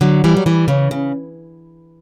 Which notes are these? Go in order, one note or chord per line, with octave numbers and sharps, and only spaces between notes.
D3 F#3
E3 G3
F#3
E3 G3
C#3 E3
C#3